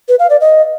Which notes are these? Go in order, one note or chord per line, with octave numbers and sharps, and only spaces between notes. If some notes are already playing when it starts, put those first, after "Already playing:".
B4
F5
D5
D#5